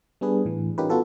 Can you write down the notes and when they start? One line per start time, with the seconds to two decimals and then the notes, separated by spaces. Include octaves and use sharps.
0.21 G3 B3 D4 G#4 B4
0.45 A2 E3
0.78 C#4 D#4 F4 G4 A#4 B4
0.89 B3 F4 F#4 A4 B4